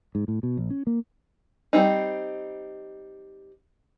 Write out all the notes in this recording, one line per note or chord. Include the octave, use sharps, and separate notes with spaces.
G#2
A2
B2
A#1
C#4
A#3
G3 C4 D#4